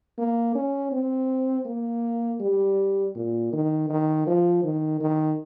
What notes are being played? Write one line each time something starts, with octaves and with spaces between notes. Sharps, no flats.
A#3
C#4
C4
A#3
G3
A#2
D#3
D#3
F3
D#3
D#3